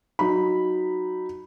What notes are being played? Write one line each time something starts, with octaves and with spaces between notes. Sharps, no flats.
F#3 D#4 B5